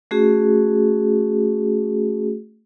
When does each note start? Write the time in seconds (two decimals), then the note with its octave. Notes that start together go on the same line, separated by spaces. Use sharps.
0.11 A3 C#4 F#4 G#4